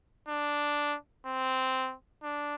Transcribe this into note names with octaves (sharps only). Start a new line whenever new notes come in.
D4
C4
D4